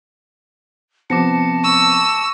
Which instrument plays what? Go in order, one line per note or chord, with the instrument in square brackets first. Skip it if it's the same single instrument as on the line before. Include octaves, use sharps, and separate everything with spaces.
[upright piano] C3 F3 B3 [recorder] A5 [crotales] D6 A#6 C#7
[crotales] C#6 [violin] E6